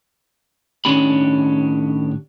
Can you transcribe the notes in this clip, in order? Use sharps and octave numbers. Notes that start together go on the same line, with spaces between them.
A2 D#3 C#4 D4 G4 B5